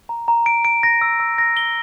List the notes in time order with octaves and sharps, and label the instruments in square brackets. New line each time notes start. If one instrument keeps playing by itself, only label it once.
[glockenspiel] A#5
A#5
D7
D7
A#6
E6
E6
A#6
G7